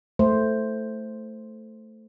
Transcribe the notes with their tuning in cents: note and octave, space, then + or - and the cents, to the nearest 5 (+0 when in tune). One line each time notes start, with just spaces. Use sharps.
A3 +0 C5 +0